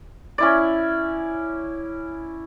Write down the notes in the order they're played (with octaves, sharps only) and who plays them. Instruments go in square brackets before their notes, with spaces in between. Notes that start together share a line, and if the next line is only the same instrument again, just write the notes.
[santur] C#4 E4 D5